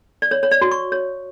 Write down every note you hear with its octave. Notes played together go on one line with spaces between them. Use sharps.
D5
C#5
C#5
D5
F#4
C#6
C#5